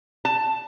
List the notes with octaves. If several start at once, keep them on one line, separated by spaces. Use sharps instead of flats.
A5